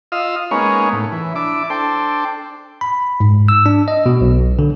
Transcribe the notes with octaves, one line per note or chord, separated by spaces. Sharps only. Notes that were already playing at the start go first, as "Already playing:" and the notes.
F4 D#5 F5 E6
G#3 A#3 B3 C#4 D#4 C#5
A2
E3
D4 E4 D6
D4 A4 C5 G5
B5
G#2
E6
D4
D#5
B2
B1
D3